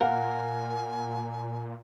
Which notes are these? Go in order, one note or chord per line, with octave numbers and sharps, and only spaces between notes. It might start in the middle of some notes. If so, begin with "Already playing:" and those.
A#2 A#4 F5 F#5 G#5